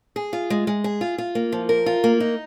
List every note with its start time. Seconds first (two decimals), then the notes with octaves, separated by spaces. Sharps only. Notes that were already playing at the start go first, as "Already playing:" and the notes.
0.16 G#4
0.33 F4
0.50 G#3
0.67 G#3
0.84 G#4
1.01 F4
1.18 F4
1.35 A#3
1.52 F3
1.69 A#4
1.86 F4
2.04 A#3
2.20 D#4